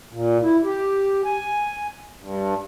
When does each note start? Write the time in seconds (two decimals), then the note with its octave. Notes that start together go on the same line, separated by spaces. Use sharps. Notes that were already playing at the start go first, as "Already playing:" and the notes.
0.13 A#2
0.43 E4
0.64 G4
1.25 G#5
2.20 G2